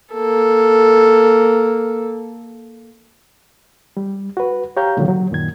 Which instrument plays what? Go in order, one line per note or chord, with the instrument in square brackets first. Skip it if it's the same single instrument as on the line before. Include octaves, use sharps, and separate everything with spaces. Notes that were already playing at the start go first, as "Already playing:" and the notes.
[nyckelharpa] A#3 A4
[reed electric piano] G3
F#4 B4
G4 C#5 F5 A#5 G6
A#2 D3 D#3 F#3
F#3
F#2 A#2 D#3 G#6